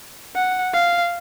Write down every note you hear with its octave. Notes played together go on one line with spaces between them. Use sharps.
F#5
F5